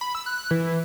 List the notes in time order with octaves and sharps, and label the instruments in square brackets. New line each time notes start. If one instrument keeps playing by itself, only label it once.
[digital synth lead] B5
E6
F#6
E3